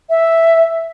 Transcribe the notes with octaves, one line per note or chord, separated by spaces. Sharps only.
E5